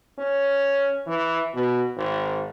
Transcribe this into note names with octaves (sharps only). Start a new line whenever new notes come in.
C#4
E3
B2
G#1